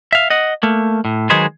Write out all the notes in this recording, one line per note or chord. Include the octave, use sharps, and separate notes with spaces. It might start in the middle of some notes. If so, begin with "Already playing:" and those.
E5 F5
D#5 F#5
A3 A#3
A2
D#3 F#3 G#3 G#4 B4 C5